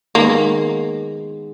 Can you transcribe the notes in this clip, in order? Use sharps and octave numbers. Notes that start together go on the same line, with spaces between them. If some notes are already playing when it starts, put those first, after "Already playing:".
D#3 G#3 A#3 B3